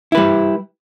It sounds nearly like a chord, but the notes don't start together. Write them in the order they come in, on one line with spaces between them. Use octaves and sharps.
E4 B4 G3